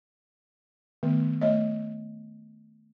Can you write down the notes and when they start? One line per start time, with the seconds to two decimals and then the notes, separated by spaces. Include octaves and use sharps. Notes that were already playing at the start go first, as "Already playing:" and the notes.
1.03 D#3 A3 B3
1.41 A3 C#5 D#5